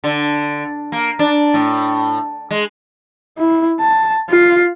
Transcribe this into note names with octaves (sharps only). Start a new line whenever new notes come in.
D3
A#3
D4
A2
G#3
E4
A5
F4